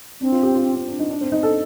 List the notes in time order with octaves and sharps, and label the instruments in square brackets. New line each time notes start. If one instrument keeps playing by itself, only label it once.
[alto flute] C4 [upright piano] D4
[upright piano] F4
G4
F4
C4
D4
D#4
D4
C4
D#4
A4